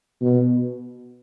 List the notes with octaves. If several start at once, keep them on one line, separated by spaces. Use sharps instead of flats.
B2